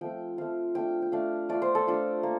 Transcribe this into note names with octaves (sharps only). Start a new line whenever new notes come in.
F3 A3 C4 G5
F3 A3 C4 F5
A3 D4 F4 G5
G5
A3 D4 F4 F5
A3 D4 F4 D5
C5
A4
A3 D4 F4
A#3